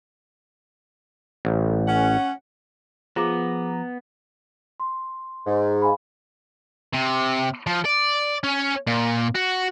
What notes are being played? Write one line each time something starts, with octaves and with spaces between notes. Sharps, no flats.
A1
C#4 F#5
F3 B3 G#4 A#5 D6
C6
G#2
F5 G#5 B5
C3
F3
D5
C#4
A#2
F#4